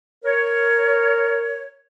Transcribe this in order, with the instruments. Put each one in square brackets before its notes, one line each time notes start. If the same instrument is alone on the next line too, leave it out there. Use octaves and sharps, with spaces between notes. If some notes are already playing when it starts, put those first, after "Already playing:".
[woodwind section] A#4 C#5